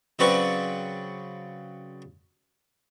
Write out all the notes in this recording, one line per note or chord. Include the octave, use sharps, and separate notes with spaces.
C#3 F#3 C4 B4 D5 C#6